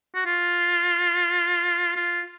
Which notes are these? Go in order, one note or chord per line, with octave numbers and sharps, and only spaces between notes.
F#4
F4
F4